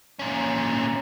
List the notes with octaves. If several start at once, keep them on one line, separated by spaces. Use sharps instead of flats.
A#2 C#4